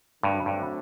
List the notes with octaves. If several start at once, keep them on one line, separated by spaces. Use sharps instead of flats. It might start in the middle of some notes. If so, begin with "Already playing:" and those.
D2 G2 D3 F#3 A3 C4
G2